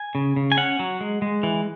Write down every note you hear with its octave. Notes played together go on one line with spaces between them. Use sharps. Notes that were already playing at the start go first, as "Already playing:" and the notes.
Already playing: G#5
C#3
C#3
G#5
C#4 F#5
F#3
G#3
G#3
E3